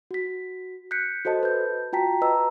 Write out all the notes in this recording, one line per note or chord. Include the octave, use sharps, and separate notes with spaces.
F#4 B6
F#6 G6 B6 C#7
F#4 A4 C5 D#5 A5
B4 G6
F4 F#4 G5 A5 A#5 B6
B4 D#5 A5 A#5 E6